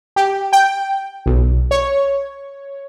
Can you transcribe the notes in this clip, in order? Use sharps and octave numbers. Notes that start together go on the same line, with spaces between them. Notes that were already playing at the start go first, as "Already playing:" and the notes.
G4
G5
B1
C#5